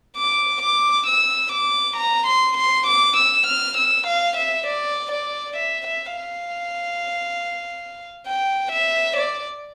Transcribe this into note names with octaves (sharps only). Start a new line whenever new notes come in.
D6
D6
E6
D6
A#5
C6
C6
D6
E6
F6
E6
F5
E5
D5
D5
E5
E5
F5
G5
E5
D5